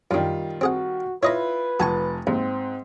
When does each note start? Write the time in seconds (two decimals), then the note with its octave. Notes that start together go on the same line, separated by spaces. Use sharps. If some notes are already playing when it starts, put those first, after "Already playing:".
0.11 F#2 D#3 G3 D4 F4
0.61 C4 F#4 G#4 F#5
1.23 E4 F4 B4 C#5 D#5 A#5
1.80 F1 F3 F#4 G#5 A5 C#6
2.27 D#2 G#2 C4